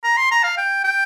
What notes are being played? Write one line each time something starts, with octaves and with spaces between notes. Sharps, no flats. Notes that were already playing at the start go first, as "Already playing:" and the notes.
A#5
C6
A#5
F5
G5
G5